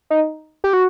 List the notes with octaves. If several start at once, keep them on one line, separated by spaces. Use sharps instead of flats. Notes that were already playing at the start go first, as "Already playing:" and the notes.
D#4
G4
F#4